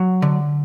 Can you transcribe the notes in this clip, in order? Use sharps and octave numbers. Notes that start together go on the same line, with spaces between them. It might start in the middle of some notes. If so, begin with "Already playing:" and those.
Already playing: F#3
D3